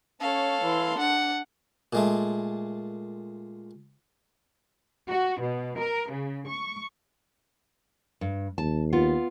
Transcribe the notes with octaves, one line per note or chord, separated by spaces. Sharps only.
C#4 A4 C#5 F5
E3 C6
D4 F#5
A#2 G#3 A3
F#4
B2
A#4
C#3
C#6
G2
D#2 A5
B3 F4